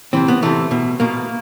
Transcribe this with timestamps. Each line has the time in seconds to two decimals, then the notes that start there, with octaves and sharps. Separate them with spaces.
0.13 C3 E3 C4
0.28 B3
0.42 C3 E3 A3
0.71 B2
1.00 B2 A#3